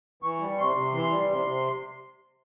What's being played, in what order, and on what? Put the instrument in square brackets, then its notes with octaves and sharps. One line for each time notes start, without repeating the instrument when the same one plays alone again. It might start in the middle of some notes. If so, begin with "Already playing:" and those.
[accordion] E3 C#6
G3
C3 C6
C3
E3 C6
G3
C3
C3